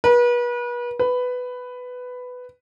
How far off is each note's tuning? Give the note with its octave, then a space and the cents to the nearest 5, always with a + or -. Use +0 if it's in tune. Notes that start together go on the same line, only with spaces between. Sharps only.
B4 -35
B4 +10